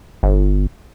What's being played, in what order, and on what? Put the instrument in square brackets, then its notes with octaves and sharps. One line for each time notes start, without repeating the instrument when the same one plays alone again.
[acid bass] G1